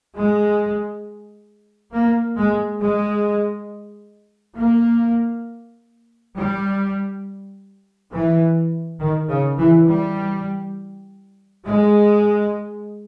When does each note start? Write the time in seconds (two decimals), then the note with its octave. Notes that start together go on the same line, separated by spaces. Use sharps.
0.16 G#3
1.93 A#3
2.37 G#3
2.81 G#3
4.58 A#3
6.35 G3
8.11 E3
8.99 D#3
9.29 C#3
9.58 E3
9.88 G3
11.65 G#3